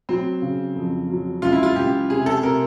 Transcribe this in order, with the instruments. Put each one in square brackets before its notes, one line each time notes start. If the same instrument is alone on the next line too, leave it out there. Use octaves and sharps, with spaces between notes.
[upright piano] F#3 [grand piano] C4
[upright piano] C#3
F2
F#3
[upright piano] C#2 [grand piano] F4
[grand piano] E4
F4
[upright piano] C#2 [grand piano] G4
[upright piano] C3 [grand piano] G#4
[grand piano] A4
[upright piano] C3 [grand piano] A#4